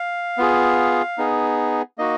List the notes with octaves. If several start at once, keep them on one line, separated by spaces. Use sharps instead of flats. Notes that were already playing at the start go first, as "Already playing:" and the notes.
Already playing: F5
B3 F4 G#4
B3 D#4 G#4
A#3 D#4 F#4 D#5